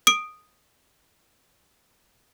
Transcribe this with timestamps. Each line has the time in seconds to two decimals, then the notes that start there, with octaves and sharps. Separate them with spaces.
0.07 D#6 D7